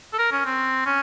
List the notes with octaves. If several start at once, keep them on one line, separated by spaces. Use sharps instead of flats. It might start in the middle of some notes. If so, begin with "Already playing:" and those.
A4
A#4
C#4
C4
C#4